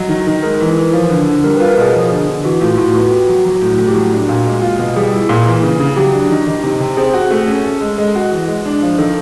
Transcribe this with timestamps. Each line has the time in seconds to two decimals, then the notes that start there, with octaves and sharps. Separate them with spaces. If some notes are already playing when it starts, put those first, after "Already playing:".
Already playing: F#3 D#5
0.09 D#3
0.27 D#3
0.43 G#3 A#4
0.60 E3
0.77 E3
0.93 F3
1.10 D3
1.27 D3
1.44 G3 A#4
1.56 F4 B4
1.69 A#4
1.77 B2 G#4
1.94 F3
2.11 D3
2.28 D3
2.44 E3 F#4
2.61 A2 F4
2.78 A2 F#4
2.94 B3 F#4
3.11 G4
3.29 F#3
3.45 F#3
3.61 A2
3.78 A2
3.87 G4
3.95 F#3 F#4
4.12 D4
4.29 A#2
4.46 G#3
4.62 F4
4.79 B2
4.96 G3 G#4
5.12 E4
5.29 A#2
5.46 E3
5.63 C#3
5.80 C#3
5.96 F#3 G4
6.13 D4
6.30 D#3
6.47 D#3
6.64 C3
6.80 C3
6.97 C4 G#4
7.13 F#4
7.31 A3
7.47 C#4
7.65 A4
7.81 G#3
7.98 G#3
8.15 F#4
8.31 E3
8.48 G#3
8.65 D4
8.82 F3
8.98 D#3 A4